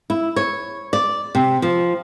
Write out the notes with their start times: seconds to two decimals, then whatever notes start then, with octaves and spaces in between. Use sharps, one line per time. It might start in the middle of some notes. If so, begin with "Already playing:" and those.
0.10 E4
0.36 C#5
0.93 D5
1.35 C3
1.62 F3